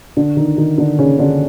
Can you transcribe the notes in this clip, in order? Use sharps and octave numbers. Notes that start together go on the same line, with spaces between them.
D3 D4
D#3 D#4
D#3 D#4
D3 D4
C#3 C#4
D3 D4